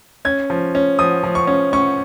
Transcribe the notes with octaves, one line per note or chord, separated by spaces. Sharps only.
C#4 G#6
F3
C#4
F3 D#6
F3
C#6
C#4
C#4 C#6